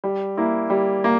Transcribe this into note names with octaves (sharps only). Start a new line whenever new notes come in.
G3
A#3 E4
G3
A#3